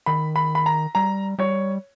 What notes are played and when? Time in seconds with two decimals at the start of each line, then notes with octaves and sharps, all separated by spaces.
0.06 D#3 B5
0.36 B5
0.55 B5
0.66 A#5
0.95 G3 A#5
1.39 G3 C#5